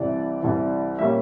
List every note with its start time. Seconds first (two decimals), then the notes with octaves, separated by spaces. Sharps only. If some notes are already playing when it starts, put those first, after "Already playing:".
Already playing: C2 C3 E3 D5
0.43 C2 C3 E3
0.99 A#2 G3 A#3 C#4 E5